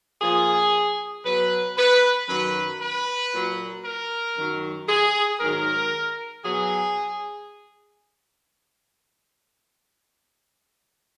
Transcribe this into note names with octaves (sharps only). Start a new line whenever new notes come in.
A#2 F3 G#4
B2 F#3 B4
B4
F#2 D#3 F#3 B4
B4
A#2 F#3
A#4
F#2 D#3 F#3
G#4
G#2 D#3 F#3 A#4
B2 F#3 G#4